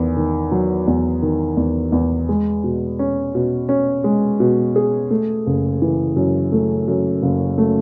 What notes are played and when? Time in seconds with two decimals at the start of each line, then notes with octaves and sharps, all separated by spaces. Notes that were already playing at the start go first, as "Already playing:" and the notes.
Already playing: E2 D#3
0.17 D#3
0.51 F#3
0.87 E2
1.22 D#3
1.57 E2
1.92 E2
2.29 G#3
2.64 B2
2.99 C#4
3.35 B2
3.69 C#4
4.04 G#3
4.40 B2
4.76 G#4
5.11 A3
5.46 F#1
5.82 E3
6.16 F#2
6.52 A3
6.88 F#2
7.22 F#1
7.58 A3